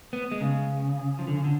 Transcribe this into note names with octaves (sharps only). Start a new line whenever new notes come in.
B3
G#3
C#3
F3
D3
C#3
D3